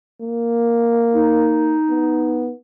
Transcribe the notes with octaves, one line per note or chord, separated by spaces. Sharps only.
A#3
D#4
B3